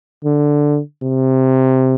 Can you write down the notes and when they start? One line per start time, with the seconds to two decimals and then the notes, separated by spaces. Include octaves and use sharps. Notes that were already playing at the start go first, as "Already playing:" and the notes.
0.25 D3
1.03 C3